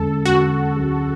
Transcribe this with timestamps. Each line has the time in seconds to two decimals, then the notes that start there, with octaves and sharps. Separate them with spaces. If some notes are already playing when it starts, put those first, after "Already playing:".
Already playing: E2 D3 G#3 C#4 A4
0.25 E2 D3 G#3 C#4 F#4
0.77 D2 D3 F#3 C#4 G#4